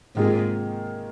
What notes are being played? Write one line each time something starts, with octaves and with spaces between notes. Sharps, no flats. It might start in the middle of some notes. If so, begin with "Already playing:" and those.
G#2 C3 D#3 A#3 F4 G#4